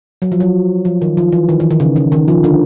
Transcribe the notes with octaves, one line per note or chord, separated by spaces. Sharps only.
F#3
F3
F#3
F3
D#3
F3
E3
D#3
E3
D#3
C#3
C#3
D#3
F3
D3